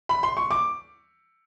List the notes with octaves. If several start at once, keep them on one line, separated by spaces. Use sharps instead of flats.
B5
C6
C#6
D6